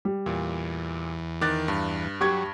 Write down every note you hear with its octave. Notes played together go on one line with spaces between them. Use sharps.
G3
E2 A#2
D#3 D6 F#6 A6
G2
F#3 G4 C#6 G#6